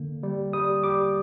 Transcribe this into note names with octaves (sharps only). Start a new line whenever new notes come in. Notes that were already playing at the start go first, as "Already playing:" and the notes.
Already playing: D3 A#3
G3
G3 D#6
G3 D6